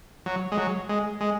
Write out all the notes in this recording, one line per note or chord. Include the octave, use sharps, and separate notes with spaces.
F#3
G#3
F#3
G#3
G#3